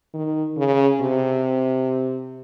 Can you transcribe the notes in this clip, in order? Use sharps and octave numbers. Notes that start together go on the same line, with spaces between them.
D#3
C#3
C3